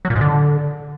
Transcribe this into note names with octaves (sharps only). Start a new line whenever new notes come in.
F#3
A#2
G#2
D3